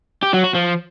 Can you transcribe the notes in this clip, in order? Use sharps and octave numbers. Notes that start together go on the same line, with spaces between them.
G4
F#3
F#4
F3